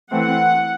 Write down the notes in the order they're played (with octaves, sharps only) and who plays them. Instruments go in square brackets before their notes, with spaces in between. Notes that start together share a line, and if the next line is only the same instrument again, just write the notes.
[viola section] E3 A3 C4 F#5